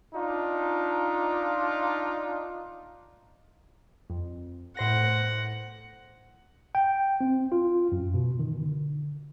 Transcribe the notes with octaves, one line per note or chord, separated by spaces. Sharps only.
D4 D#4 F4
F2
A2 C5 F#5 A#6
G5
C4
F4
F#2
B2
D#3
D3